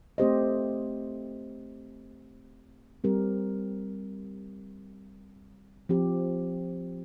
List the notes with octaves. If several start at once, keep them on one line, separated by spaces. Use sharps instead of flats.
A3 C4 G4 C5 D#5
G3 C4 G4 A#4
F3 C4 G4